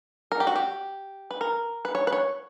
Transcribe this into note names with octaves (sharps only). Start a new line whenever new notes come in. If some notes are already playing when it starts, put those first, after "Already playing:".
A#4
G4
F#4
G4
B4
A#4
B4
C#5
B4
C#5